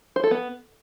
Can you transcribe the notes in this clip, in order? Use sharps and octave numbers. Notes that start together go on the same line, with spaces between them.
C5
A4
B3